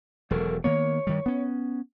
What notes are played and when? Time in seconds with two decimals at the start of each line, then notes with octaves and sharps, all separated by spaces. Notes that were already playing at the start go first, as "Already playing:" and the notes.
0.31 E1 F#3 A4 A#4
0.64 D#3 A#3 B3 C#5
1.07 G2 D#3 G3
1.26 B3 C#4